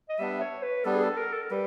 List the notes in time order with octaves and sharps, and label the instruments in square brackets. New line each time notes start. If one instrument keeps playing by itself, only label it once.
[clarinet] D#5
[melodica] G3 B3 D4 [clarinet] E5
[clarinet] C#5
B4
[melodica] G3 B3 D4 [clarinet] A4
[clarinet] G#4
A4
A#4
A4
A#4
[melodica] G3 [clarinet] B4